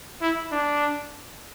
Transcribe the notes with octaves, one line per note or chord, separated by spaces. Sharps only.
E4
D4